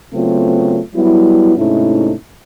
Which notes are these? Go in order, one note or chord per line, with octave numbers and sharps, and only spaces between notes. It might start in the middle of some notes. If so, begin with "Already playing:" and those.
C#3 F#3 A3 B3 C4 F4
F#3 G3 B3 E4
G#2 C3 A3 C#4 D#4 E4